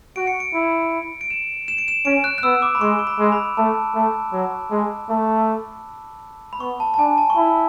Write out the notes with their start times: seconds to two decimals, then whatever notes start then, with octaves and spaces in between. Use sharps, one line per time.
0.16 F#4 D7
0.27 C#7
0.40 D7
0.54 E4
1.21 D7
1.30 E7
1.68 E7
1.78 D7
1.88 E7
2.05 C#4 D7
2.24 F#6
2.38 F#6
2.43 B3 E6
2.62 D6
2.75 B5
2.81 G#3 C#6
2.99 C#6
3.07 B5
3.19 G#3
3.32 B5
3.57 A3 A5
3.95 A3
4.33 F#3
4.71 G#3
5.09 A3
6.53 B5
6.60 B3 C#6
6.80 A5
6.94 A5
6.98 D4 G#5
7.18 A5
7.30 C#6
7.36 E4 B5